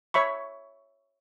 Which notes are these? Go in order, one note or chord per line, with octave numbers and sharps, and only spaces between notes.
C#5 E5 B5 C#6